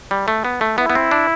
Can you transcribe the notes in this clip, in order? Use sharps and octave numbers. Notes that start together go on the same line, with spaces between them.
G3
A3
B3
A3
B3 E4
B3
C4
D4